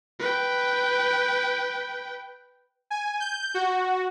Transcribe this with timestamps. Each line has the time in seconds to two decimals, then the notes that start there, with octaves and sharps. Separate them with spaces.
0.19 B4 G5
2.90 G#5
3.20 G6
3.54 F#4